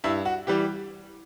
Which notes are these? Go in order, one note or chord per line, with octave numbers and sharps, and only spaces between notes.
G2 E4
F#4
E3 G3 G4